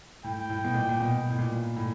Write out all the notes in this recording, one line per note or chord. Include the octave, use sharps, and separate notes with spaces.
A2 G5
A2
B2
A#2
A#2
B2
A2
A#2
A2